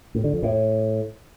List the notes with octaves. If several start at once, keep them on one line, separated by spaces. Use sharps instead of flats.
A2
D3
F2
A2